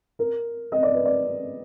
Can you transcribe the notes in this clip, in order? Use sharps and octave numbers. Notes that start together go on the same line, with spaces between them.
A#4
D#5
D5
B4
D5